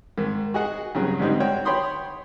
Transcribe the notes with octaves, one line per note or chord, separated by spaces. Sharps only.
G#2 D#3
F#4 G#4 D#5 F#5
G2 C#3 F#3
G#2 D3 G3 C4 D#4
F#4 C#5 G5
C#5 G5 B5 C6 D#6